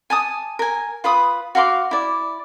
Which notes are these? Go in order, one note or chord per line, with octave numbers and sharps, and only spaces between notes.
G#5 A5 D#6
A#4 G#5
F4 B4 B5 D#6
F#4 F5 C6 D6
E4 D5